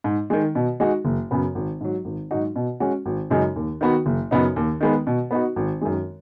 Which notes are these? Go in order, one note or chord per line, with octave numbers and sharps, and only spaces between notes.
G#2
D#3 G#3
B2
G#3 D#4 F#4
F#1
F#2 C#3 B3
G#1
G#2 F#3
G#1
G#2 F#3 D#4 F#4
B2
G#3 C#4 F#4
G#1
F#2 C#3 G#3 D#4
D#2
D#3 B3 F#4
F#1
F#2 C#3 B3 D#4
D#2
D#3 G#3 B3
B2
B3 D#4 F#4
G#1
F#2 D#3 G#3